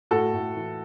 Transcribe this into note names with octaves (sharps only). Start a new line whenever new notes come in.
A2 F#4 A4
A2
E3